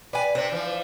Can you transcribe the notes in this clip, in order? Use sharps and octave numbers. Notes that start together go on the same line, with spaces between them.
B4 D5 G#5
C3 C4 D4
E3 F3